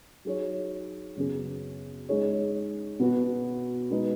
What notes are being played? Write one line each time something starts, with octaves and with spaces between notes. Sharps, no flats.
F#3 D#4 G#4 C#5
F#2 C#3 B3 G#4
G#3 D#4 G#4 C#5
B2 B3 F#4
B2 G#3 D#4 G#4 B4